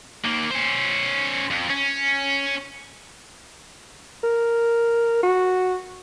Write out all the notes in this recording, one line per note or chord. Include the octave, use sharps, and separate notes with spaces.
D#2 A#3
C#4 C5
F2
C#4
A#4
F#4